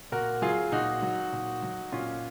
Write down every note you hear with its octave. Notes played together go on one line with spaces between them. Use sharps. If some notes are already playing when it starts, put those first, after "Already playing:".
A#2 F#4 A#4
F#3 F4 G#4
A#2 D#4 F#4
F#3
A#2
F#3
A#2 C#4 F4